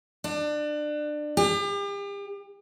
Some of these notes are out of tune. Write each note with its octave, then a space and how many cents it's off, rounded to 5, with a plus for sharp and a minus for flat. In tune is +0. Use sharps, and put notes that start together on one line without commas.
D4 +25
G4 +40